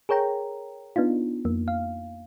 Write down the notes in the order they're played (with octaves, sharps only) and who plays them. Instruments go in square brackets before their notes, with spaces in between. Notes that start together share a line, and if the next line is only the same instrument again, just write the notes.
[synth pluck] G#4 A#4 C#5 G5 A#5
B3 D4 D#4 F4
F2 A#3
F5